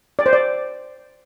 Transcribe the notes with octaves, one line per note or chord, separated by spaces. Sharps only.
D5
C5
D5